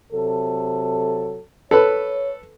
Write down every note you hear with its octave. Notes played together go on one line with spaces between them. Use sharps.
C3 F#3 A4
A4 B4 C#5 B5